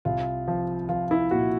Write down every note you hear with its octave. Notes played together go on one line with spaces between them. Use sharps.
C2 F4
F3
F3 F4
E4
A#2 F#4